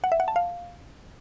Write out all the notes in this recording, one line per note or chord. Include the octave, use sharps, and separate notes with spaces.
F#5
E5
F#5
A5
F5